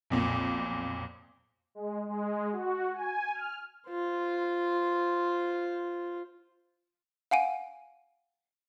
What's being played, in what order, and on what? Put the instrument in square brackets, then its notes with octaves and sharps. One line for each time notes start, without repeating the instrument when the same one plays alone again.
[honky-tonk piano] B1 F2 A#2
[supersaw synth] G#3
G#3
F#4
G#5
F6
[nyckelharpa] F4 C5
[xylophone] F5 F#5 G#5 D#7